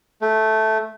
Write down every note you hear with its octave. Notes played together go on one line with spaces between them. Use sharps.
A3